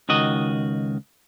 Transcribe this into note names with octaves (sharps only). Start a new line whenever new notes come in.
C#2 D#3 F#4 D#5